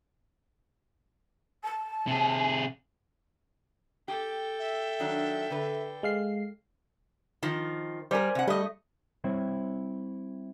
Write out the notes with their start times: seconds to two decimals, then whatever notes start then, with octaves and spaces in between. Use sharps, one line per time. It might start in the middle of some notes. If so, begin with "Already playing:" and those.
1.64 A5
2.07 C3 G#4
4.08 G4 A4 G5
4.59 E5
5.00 D#3 F#3 D4
5.50 D3 B4
6.03 G#3 F5 C7
7.43 D#3 F3 D#4
8.11 G3 A#4 C5 D5 G#5
8.35 C3 F#5
8.47 G3 A3 D#5
9.24 G3 C4 E4 C5 C#5